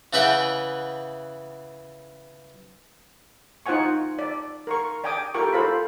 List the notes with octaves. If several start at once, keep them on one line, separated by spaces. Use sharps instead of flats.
C#3 E3 B4 E5 F#5 G5
D#4 F4 C5 F#5 G#5 C#6
D5
A#4 C6 C#6
D5 G5 G#5 D6 D#6
F4 G4 A4 A#4 G5 C#6
F4 A4 C5 F5 B5